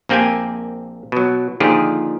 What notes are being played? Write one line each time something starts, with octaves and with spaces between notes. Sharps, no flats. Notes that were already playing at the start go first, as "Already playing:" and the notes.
A#1 A#3 C4 G4 G5 G#5
B2 F#3
A#2 D3 D#3 F3 G4 G#4